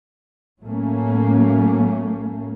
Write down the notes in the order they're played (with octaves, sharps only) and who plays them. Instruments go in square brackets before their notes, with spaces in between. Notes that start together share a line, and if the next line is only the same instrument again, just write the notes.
[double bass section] A2 F#3 A3 A#3 C#4